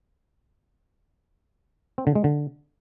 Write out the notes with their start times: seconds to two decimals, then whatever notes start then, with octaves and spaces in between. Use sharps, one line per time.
1.98 C4
2.07 D3
2.15 G#3
2.24 D3